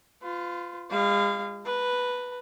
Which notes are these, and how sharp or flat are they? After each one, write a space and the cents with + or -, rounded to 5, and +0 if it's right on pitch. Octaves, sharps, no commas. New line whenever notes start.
F4 +0 B4 +45
G#3 -45 F5 -20
B4 +0 A#5 -40